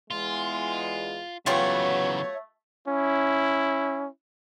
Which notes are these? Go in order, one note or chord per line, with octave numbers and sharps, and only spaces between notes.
E2 G#3 F4
C#3 E3 F#3 A3 B3 F4 G4 C#5
C#4 E4